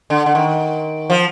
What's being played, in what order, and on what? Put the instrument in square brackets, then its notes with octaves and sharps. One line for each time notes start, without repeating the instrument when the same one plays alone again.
[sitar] D3
D3
D#3
F3